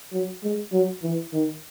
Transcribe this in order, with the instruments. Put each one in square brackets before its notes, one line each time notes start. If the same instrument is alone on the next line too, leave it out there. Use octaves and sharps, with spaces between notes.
[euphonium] F#3
G#3
F#3
E3
D#3